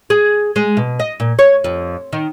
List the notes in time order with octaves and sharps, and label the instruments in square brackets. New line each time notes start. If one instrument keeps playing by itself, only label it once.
[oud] G#4
G#3
B2
D#5
A#2
C#5
F2
D#3